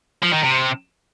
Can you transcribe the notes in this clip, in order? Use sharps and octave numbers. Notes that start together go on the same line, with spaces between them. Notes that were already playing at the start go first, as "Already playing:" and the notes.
F3
D#3
C3